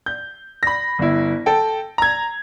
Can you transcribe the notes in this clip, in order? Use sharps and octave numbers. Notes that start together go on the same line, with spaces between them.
G6
B5 A#6
G1 E4
A4 G5
A#5 G#6